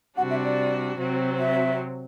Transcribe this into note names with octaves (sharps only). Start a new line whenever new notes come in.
C3 G3 D4 F#4 F#5
E5
D5
C3 F#3 C4 F#4
E5